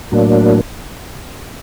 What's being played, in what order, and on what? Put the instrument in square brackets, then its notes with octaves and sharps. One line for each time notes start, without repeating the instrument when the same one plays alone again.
[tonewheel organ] A2 F#3 A#3 D4